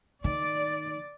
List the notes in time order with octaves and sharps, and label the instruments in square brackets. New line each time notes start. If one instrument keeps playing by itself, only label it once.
[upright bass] D#3 [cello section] D5